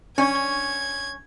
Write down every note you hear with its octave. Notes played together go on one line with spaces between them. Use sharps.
C#4 D4 D5 C#6 G#6